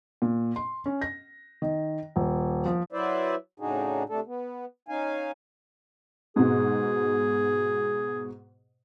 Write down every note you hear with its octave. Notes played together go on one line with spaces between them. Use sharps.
A#2
C6
C#4
A#6
D#3
D#1
F3
F#3 E4 B4 C5 D5 E5
A2 C#3 D4 D#4 F#4 G#4
C3 A3 D4 A4
B3
C#4 D#4 F5 G#5
G#2 B2 G#4